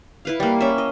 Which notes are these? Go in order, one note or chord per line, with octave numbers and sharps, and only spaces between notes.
E4 B4 F5
G3 A#3
C#4 E5
D#5